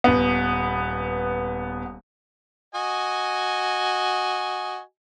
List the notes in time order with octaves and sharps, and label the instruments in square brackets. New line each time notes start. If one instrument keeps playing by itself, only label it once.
[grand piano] D#1 B3
[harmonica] F#4 D#5 G#5